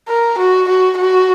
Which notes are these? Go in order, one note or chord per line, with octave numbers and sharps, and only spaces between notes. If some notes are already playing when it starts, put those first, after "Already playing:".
A#4
F#4
F#4
F#4